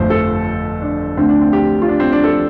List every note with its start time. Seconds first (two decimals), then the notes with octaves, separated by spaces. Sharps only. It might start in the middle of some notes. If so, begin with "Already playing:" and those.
Already playing: G1 F2 F3 A3 C5
0.10 A4
0.82 D4
1.17 D2 D3 A3 C4
1.29 D4
1.41 C4
1.53 G4
1.82 F4
1.88 D4
2.00 C4
2.12 D4
2.24 A4